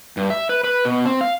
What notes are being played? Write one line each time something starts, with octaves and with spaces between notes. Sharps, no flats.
G2
E5
B4
B4
B2
C4
F5